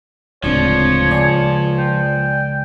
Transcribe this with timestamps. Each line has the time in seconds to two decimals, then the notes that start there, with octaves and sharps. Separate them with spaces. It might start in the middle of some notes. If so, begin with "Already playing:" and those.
0.44 D1 C#2 F3 C4 D4 C#5 D5
1.11 C#2 D5 G#5
1.78 G5